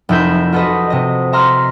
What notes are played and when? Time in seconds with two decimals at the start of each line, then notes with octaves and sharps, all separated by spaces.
0.09 F1 F3 E4 A#4 G6 E7
0.53 F4 F#4 A4 B4 D#5
0.90 C3 D#5
1.33 E5 A#5 C6 F6